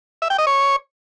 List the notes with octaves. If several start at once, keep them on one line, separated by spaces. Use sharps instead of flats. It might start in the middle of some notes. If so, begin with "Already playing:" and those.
E5
G5
D#5
C#5